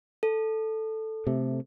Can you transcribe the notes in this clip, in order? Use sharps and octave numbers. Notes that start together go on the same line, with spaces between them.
A4
C3 A3